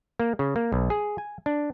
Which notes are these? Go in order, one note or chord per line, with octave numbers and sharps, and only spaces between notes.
A#3
C#3
A#3
B1
G#4
G#5
D4